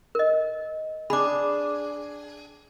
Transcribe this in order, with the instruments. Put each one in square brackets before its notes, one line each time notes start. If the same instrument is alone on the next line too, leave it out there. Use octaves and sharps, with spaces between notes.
[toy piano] A#4 D#5
[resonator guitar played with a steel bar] D4 G#4 [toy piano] B5 D6